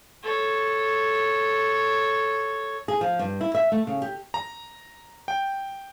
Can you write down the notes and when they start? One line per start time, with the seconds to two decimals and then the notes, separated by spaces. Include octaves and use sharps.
0.23 A4 C#5
2.88 G#4
3.01 F3
3.19 G2
3.41 E4
3.55 E5
3.72 A3
3.87 C#3
4.02 G4
4.34 A#5
5.28 G5